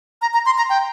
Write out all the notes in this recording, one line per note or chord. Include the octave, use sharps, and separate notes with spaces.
A#5
A#5
C6
A#5
G5